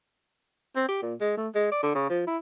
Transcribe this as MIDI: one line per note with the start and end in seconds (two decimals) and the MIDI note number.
0.76 0.88 60
0.88 0.98 67
1.02 1.14 46
1.20 1.35 56
1.37 1.48 57
1.55 1.67 56
1.71 1.82 74
1.83 1.93 50
1.95 2.06 49
2.10 2.23 53
2.27 2.37 64